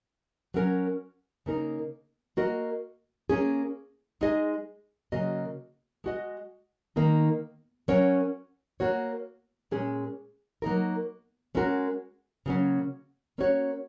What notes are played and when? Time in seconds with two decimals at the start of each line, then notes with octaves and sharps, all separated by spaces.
0.54 F#3 C#4 A#4
1.46 C#3 A#3 D#4 A#4
2.37 A#3 F#4 A#4 D#5
3.29 A#3 C#4 G#4
4.21 G#3 D#4 G#4 D#5
5.12 C#3 F#3 A#3 F#4 D#5
6.04 G#3 F#4 D#5
6.96 D#3 A#3 D#4
7.88 F#3 C#4 A#4 C#5
8.80 A#3 F#4 C#5
9.71 A#2 G#3 C#4 G#4
10.62 F#3 A#3 D#4 A#4
11.55 G#3 C#4 F#4 A#4
12.46 C#3 F#3 A#3 C#4
13.38 A#3 C#4 F#4 C#5